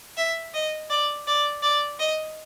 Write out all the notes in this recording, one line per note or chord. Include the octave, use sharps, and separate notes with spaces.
E5
D#5
D5
D5
D5
D#5